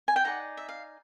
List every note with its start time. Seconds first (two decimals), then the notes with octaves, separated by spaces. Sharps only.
0.08 G#5
0.16 G5
0.24 D#4 G#4 B4 D5 F#5
0.57 E5
0.69 F5